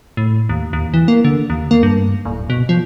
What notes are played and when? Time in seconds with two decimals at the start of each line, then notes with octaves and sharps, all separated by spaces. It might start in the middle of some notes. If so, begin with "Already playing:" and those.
0.17 A2
0.49 D#2
0.73 D#2
0.94 E3
1.08 A#3
1.25 D3
1.50 D#2
1.71 A#3
1.83 G2
2.25 D1
2.50 B2
2.69 F3